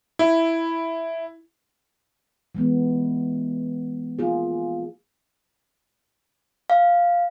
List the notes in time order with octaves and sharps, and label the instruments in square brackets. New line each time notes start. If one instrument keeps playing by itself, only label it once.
[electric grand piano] E4
[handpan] E3 G#3 B3
A#3 F4 G#4
[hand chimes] F5